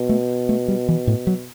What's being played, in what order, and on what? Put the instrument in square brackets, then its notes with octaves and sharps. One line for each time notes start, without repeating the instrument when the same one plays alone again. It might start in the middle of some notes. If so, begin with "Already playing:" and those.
Already playing: [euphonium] B2
[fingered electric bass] A3
A3
G3
E3
A2
F#3